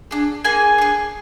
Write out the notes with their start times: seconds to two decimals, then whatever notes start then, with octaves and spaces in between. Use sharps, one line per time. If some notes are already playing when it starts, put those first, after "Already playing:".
0.11 D4 G#4
0.44 A#3 G#4 G#5
0.78 D4 G#4